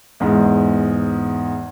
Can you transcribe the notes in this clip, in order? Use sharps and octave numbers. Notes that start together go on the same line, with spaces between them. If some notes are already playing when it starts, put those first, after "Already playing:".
E2 G#2